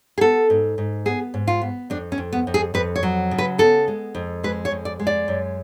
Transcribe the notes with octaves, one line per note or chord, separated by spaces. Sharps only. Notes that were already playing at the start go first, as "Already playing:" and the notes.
G#4
B3 A4
G#2
G#2
B3 G#4
G#2
F4
B3
F2 D4
C#4
F2
B3
F2
G#4
F2 B4
C#5
F#3
C#3
B4
B3 A4
G#3
F2
G#3 B4
C#5
F2
D5
G#3
D5
F#2